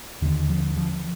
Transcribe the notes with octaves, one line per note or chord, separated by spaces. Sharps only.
D#2 D3 D#3
F3
F3